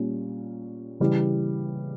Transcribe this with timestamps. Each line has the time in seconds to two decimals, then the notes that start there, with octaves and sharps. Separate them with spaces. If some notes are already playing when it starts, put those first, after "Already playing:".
Already playing: A#2 G3 C#4
1.00 C#3 E3 G3